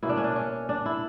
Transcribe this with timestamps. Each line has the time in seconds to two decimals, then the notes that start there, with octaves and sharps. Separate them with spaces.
0.03 B2 A#3 C#4 E4
0.09 D4
0.17 C#4
0.24 D4
0.36 C#4
0.69 D4
0.86 E4